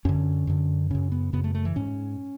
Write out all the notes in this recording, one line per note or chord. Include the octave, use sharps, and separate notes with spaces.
F#2 D3 C#4
F#2 D3
F#2 C#3 C#4
B3
F#2 C#3 B3
A3
A3
E3
G#2 C#4